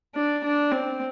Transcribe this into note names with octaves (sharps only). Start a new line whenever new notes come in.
D4
D4
C4